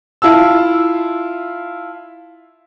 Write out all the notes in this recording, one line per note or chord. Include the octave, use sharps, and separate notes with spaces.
E4 F4 A5 E6